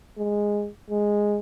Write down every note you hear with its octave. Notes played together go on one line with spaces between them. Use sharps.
G#3
G#3